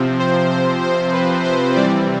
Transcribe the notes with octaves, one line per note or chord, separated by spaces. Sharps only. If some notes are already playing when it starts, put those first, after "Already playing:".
Already playing: C3 F3 C4
C5
C5
C5
B4
C5
C3 E3 G3 C4 D5